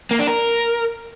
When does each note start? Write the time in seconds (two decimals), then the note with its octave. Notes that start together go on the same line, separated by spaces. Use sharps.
0.11 A#3
0.19 D4
0.27 A#4